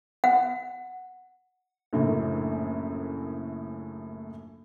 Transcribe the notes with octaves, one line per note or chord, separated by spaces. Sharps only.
F#5
A#1 F#2 A2 C#3 A3 A#3